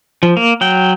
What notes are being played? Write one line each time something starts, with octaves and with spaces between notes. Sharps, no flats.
F3
A#3
F#3 G5